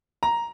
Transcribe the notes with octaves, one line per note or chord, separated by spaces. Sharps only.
A#5